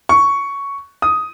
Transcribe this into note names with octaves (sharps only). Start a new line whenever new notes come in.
C#6
D#6